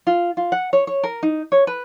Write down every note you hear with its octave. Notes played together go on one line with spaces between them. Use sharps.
F4
F4
F#5
C#5
C#5
A#4
D#4
C#5
B4